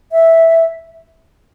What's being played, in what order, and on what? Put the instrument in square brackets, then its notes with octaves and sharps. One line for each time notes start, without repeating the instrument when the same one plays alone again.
[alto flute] E5